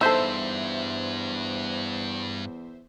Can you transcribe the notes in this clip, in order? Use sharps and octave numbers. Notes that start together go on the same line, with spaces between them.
E2 G2 D#4 A4 C5 E5